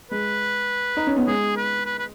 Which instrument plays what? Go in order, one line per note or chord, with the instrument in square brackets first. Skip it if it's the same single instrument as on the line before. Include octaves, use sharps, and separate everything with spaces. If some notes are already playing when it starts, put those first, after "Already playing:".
[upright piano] G#3 [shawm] B4
[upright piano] D#4
C#4
B3
[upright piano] G#3 [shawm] G#4
[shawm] B4
B4
B4